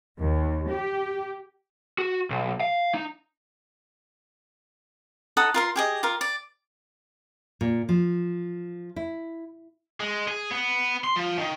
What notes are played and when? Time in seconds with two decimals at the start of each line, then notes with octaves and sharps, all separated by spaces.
0.19 D#2
0.69 G4
1.98 F#4
2.30 B1
2.61 F5
2.94 D#4
5.37 D#4 A4 F#5 D#6
5.54 F4 A#4 C6
5.76 G4 G#4 D#5
6.03 F4 A#4
6.21 D5
7.61 A#2
7.89 F3
8.96 E4
10.00 G#3
10.28 G#4
10.51 B3
11.04 C6
11.16 F3
11.39 D#3